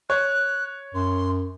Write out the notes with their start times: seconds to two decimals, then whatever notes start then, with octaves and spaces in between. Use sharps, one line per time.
0.10 C#5 F#6
0.95 F#2 C6